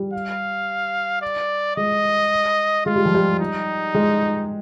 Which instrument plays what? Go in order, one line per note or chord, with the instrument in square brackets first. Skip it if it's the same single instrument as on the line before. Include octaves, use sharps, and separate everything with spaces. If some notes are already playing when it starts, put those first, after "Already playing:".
Already playing: [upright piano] G3
[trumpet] F5
D5
[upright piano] G#3 [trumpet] D#5
[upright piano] G#3 [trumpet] F4
[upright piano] G3
F3
G3
[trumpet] D#4
[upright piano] G#3